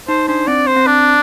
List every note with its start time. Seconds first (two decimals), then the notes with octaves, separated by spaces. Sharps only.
0.08 D#4 C5
0.28 D4 C5
0.47 C4 D5
0.67 C5
0.76 C4
0.87 D4